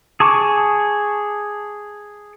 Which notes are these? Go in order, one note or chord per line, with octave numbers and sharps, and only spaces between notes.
G#4 A5 C#6 D6